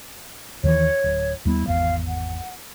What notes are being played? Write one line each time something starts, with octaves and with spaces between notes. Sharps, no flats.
D#2 D#3 E3 C#5
D1
D#2 G3 B3 E4
G#1 E2 F5
F#5